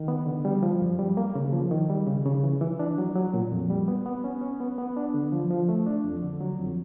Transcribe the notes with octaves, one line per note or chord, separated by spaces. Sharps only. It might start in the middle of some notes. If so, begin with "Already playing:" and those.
Already playing: D#3
B3
D3
G3
F3
F#2
G3
A#3
C#3
F3
D#3
G3
C#3
C#3
E3
E3
D4
F#3
F#3
A#2
F2
G3
B3
B3
C#4
C#4
B3
B3
D4
D3
F3
F3
A3
D4
F2
D3
F#3
F2